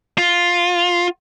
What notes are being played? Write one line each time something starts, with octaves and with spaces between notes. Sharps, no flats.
F4